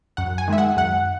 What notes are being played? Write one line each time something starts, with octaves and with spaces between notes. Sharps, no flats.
F#2 F#5
G#5
D#3 G#3 E5
F#5
F#2 F#5